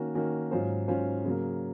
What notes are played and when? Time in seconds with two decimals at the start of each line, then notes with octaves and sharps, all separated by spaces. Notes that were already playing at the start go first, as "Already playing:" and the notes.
Already playing: D#3 A#3 C#4 F#4
0.15 D#3 A#3 C#4 F#4
0.51 G#2 F#3 C#4 F4 C5
0.88 G#2 F#3 C#4 F4 C5
1.25 C#3 F#3 A#3